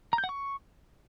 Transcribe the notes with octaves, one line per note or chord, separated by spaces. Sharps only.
A#5
G6
F#5
C#6